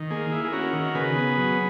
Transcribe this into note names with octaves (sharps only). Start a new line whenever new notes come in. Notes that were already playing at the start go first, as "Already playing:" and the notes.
Already playing: D#3
A#3 G#4
E4
G#4
C#4 F#4 A#4
D#3
C#3 G#4 B4
B3
F#3